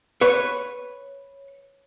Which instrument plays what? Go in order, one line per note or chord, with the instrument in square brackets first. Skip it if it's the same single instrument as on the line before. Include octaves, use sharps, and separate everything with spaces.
[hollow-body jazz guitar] B4 C#5